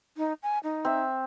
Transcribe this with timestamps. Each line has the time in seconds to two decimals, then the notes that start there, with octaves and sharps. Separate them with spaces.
0.17 D#4
0.43 G#5
0.64 D#4
0.85 C4 E5